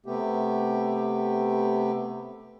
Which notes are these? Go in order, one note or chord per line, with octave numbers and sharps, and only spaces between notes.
C3 A3 B3 G4